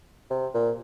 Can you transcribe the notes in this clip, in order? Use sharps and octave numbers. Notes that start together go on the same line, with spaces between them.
C3
A#2